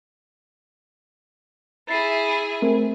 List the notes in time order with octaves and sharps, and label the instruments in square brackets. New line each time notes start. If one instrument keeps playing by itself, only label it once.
[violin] E4 G#4 [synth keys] A6 C7
[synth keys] A3 C4 A#4